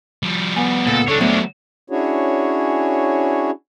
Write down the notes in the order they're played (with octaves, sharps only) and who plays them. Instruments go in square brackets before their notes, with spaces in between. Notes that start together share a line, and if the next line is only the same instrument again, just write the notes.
[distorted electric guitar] F3 G3
[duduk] B3 [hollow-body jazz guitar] G#5
[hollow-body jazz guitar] C#2 [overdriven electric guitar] A#2 [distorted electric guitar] A4
[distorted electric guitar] D3 [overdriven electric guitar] D4 C#5 [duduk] A4
[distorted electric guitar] F#3 G#3 [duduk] A3 [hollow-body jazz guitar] B3 F#4 C5
[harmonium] C#4 D4 E4 F#4 G#4 C#5